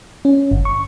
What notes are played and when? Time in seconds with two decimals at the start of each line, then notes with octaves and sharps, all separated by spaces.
0.25 C#4
0.51 G1
0.65 C#6